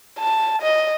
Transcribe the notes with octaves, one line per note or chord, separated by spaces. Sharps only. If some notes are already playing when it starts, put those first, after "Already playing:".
A5
D#5